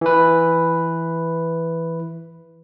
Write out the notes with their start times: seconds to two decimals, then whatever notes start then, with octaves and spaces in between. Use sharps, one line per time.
0.01 E3 B4